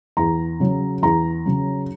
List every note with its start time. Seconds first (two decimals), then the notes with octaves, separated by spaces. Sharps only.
0.17 E2 A#5
0.60 C#3 F#3
1.02 E2 A#5
1.46 C#3 F#3